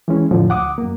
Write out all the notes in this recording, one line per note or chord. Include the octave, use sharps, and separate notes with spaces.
E3 G#3 C#4
F2 A2 D3 F3
D2 F#5 D6 D#6
F#2 A#3